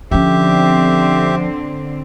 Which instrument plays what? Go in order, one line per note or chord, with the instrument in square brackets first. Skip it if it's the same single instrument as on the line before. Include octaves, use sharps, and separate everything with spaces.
[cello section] D3 C4 [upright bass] F3 C#4 [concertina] G4 E5